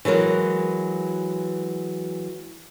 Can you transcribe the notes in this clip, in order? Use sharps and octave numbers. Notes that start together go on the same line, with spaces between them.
E3 F#3 G#3 A#4